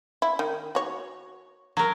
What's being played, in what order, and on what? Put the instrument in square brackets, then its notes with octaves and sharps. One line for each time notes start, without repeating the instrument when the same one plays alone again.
[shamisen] E4
D#3
F#4 C#5
[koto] F#3 A#4